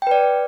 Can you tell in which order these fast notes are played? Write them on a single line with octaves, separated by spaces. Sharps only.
G5 B4 D5